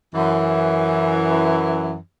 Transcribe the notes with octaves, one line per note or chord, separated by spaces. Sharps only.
F#2 E3